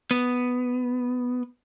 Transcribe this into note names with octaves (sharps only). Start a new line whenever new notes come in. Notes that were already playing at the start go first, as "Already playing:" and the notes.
B3